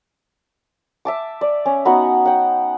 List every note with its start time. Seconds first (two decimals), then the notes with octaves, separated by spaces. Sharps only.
1.05 E5 A5 D6
1.41 D5
1.66 C#4
1.85 B3 D#4 F#4 F#5
2.26 F#5 G5